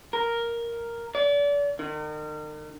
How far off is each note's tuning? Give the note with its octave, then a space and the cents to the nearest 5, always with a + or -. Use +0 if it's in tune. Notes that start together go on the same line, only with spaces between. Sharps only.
A#4 +0
D5 -35
D#3 -40